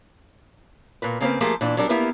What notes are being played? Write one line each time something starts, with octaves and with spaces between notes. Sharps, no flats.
A#2 A#4 B4
C#3 A#3 C4 B4
F3 A3 A#3 G4 G#4 A#4
A#2 E3 D4
F#3 G3 D4 A#4
A#3 B3 E4 G4 A#4 B4